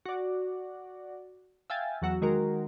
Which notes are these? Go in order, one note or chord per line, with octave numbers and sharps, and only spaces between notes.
F#4 D5
E5 F5 G5 G#5 A6
E2 F#3 F#4 E6
D#3 G#3 F#4 A#4